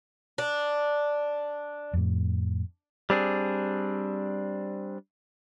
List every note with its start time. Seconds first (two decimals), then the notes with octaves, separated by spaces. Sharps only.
0.38 D4
1.93 F2 A2
3.10 G3 C4 D4 G#4